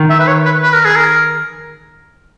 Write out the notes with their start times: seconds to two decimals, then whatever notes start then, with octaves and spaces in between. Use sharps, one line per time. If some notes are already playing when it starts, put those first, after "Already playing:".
Already playing: D#3
0.10 E5
0.19 B4
0.27 C#5
0.45 B4
0.62 B4
0.73 A#4
0.85 G#4
0.96 A#4